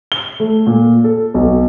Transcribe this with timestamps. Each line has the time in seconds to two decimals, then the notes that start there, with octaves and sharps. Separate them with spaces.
0.12 G7
0.40 A3
0.67 A#2
1.04 A4
1.34 B1